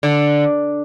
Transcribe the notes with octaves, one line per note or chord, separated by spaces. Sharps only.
D3